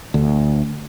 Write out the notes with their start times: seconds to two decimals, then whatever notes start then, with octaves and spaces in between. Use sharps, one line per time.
0.14 D2